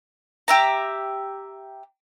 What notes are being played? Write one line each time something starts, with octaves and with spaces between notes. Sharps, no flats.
G4 E5 A#5